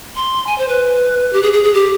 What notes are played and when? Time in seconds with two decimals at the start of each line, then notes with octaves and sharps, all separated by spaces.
0.16 C6
0.47 G#5
0.58 C5
0.68 B4
1.33 G4
1.43 G#4
1.53 G#4
1.64 G#4
1.74 G4